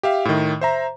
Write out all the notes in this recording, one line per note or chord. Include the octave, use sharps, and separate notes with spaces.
G4 E5 F5
A2 D#3
C5 E5 A#5